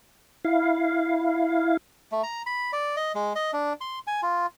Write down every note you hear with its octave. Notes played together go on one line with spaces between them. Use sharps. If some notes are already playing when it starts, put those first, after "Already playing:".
E4 F5
A3
A#5
B5
D5
D#5
G#3
D#5
D4
C6
G#5
F4